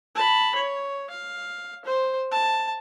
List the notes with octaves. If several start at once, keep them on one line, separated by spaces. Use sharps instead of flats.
A5 B5
C#5
F5
C5
A5